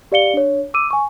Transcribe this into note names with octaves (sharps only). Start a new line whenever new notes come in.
G4 D5 F5 C#7 G7
D4 C#5
D6 E6 D#7
G#5 C#6